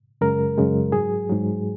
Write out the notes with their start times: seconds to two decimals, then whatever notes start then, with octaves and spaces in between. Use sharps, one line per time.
0.21 F#2 C#3 G#3 A#4
0.58 F#2 C#3 G#3
0.92 G#2 F#3 G#4
1.29 G#2 F#3